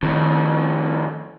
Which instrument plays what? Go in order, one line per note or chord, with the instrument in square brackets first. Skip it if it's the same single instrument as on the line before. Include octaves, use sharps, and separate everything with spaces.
[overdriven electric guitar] F2 A2 [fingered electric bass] D#3